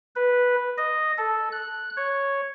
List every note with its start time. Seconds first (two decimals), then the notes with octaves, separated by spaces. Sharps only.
0.16 B4
0.78 D#5
1.18 A4
1.52 F#6
1.97 C#5